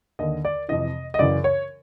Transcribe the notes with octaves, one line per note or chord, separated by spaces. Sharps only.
D#2 D3 D#5
D5
F2 C3 E3 D#5
D#5
F#2 C#3 E3 D5
C#5